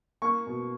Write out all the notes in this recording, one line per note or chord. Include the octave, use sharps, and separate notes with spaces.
A#3 C#6
B2